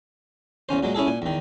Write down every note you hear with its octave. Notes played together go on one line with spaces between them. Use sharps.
E2 C#3 C#4 C5
A#2 F#3 G#3
C#4 E4 G#4 A4
A#2 G#5
E2 D#3